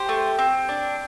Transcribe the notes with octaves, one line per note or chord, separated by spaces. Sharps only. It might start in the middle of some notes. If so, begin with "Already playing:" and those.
Already playing: G4 C5
A3
C4
D4